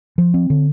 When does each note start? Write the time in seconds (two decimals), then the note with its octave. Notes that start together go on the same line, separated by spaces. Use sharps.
0.18 F3
0.34 C4
0.50 D3